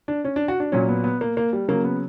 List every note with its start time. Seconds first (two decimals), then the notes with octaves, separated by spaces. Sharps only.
0.08 D4
0.25 C#4
0.36 D4
0.48 F#4
0.60 D4
0.72 A#2 F#3 C#4
0.88 B3
1.04 B3
1.21 A#3
1.37 A#3
1.53 G3
1.68 C#3 F#3 A#3
1.84 B3